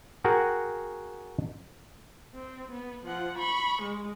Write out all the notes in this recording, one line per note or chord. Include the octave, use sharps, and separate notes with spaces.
F#4 G#4 A#4 F#5 G5
C4
B3
F3 F#5
B5 C#6
G#3